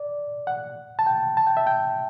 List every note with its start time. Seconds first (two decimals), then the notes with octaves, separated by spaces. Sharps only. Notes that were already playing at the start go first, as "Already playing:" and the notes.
Already playing: D5
0.47 F#5
0.99 A5
1.06 G5
1.37 A5
1.47 G5
1.57 E5
1.67 G5